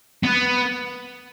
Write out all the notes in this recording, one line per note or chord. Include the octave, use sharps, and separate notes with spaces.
B3